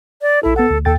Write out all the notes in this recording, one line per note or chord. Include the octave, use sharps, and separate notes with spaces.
D5
A#1 E4 A4
B3 A4 F#5
D2
D#2 A4 G5 A6